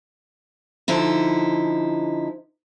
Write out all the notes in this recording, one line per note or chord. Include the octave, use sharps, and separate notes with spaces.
D3 F3 D#4 E4